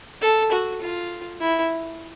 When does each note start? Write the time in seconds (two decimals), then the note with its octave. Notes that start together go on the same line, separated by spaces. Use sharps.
0.22 A4
0.52 F#4
0.82 F4
1.41 E4